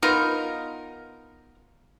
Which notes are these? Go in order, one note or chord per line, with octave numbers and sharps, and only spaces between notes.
B3 D#4 F4 A#4